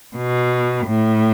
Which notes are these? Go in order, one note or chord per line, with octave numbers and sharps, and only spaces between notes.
B2
A2